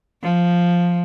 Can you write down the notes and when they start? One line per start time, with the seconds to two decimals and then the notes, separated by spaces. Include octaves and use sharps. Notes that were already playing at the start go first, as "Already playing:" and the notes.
0.23 F3